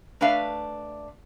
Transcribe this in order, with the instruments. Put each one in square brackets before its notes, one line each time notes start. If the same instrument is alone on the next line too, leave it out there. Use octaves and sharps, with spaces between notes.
[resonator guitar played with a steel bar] A3 D4 B4 E5 F5